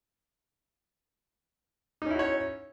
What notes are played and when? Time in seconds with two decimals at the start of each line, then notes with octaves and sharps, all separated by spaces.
2.02 D#4
2.06 C#4
2.10 E4
2.15 F#4
2.19 C#5